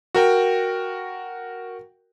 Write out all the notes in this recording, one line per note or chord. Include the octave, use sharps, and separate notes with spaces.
F#4 A#4 G5